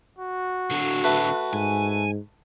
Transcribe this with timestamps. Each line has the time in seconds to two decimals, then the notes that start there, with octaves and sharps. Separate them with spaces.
0.18 F#4
0.71 D3 F#3
1.04 A3 B4
1.53 G#2 G#5